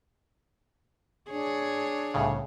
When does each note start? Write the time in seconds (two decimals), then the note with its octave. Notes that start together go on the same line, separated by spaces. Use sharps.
1.31 D4 G#4 C#5
2.14 C2 A2 C#3